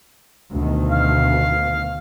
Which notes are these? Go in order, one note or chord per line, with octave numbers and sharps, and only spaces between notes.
D2 B2 D#3
F5